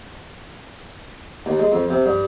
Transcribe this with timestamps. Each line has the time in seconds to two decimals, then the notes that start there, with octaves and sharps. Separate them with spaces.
1.46 D#2
1.59 G#3
1.72 F2
1.90 C3
2.06 G2